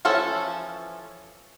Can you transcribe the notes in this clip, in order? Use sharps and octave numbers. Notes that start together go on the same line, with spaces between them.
E3 F3 C#4 A4